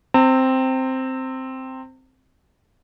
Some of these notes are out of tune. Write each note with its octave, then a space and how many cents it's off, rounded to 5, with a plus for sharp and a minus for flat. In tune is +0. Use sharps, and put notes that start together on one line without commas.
C4 +0 A#5 -45